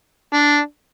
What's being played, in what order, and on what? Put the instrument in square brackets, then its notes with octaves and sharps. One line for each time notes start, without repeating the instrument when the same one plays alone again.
[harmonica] D4